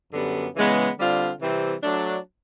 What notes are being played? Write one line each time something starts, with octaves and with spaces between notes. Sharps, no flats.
F#2 D3 G3 B3
C#3 E3 G#3 B3
D3 G3 C4 F4
C3 E3 G3 C4
F#3 A3 D4